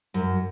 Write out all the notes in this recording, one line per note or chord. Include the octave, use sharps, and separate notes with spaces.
F#2